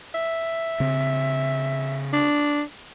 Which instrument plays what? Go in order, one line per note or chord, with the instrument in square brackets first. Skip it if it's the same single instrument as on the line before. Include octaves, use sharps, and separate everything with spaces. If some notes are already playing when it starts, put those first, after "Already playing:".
[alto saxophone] E5
[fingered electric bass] C#3 C4
[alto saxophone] D4